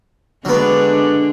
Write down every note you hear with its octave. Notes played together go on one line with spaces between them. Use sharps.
D3 F#3 G#3 B3 D4